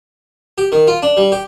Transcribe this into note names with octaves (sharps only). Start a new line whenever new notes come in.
G4
D#3
F4
D4
G3
G4